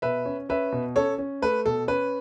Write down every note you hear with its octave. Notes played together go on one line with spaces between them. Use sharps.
B2 B4 E5
C#4
C#4 B4 E5
B2
C#4 A4 C#5
C#4
A3 B4
B2 A4
C#4 B4